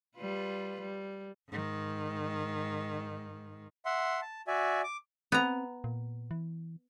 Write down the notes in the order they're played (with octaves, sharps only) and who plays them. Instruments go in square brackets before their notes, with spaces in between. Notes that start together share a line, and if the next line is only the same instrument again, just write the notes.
[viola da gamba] G3 F4 B4
G3
[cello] G#2 D#3
[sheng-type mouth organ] E5 F#5 C6
A5
F#4 D5 E5 G#5
D6
[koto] B3 A#5 [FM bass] C4
[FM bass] A#2
E3